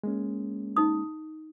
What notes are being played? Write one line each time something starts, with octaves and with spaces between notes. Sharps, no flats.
G#3 A#3 C#4
D#4 D#6